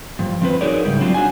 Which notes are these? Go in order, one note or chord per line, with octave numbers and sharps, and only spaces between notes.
G2 F3
F3 C4 B4 C5
D#4 F#4 G#4 A#4 C#5 D5
G#2 C#3 G3 E4
F#3 C4 D4 F4
F#4 G#5